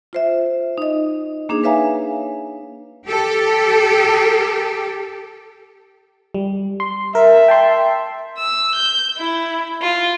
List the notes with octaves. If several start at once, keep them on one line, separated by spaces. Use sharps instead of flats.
F4 C5 E5
D#4 D#5
A#3 D4 D#4 G#4
B4 C#5 E5 F5 G#5 A#5
G4 A4
G3
C6
A#4 E5
G5 A5 C6
E6
G6
E4
F4